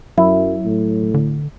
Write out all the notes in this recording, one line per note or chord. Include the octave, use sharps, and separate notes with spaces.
F#2 F#3 E4
A2
D3